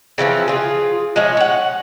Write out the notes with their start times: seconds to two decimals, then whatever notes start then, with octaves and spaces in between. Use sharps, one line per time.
0.18 C#3 E3 F3 C4
0.48 F4 G#4
1.16 F3 G#3 C#4 E5
1.37 C#5 F#5